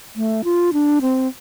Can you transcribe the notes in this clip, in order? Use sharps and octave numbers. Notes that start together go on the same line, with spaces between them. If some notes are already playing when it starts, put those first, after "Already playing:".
A3
F4
D4
C4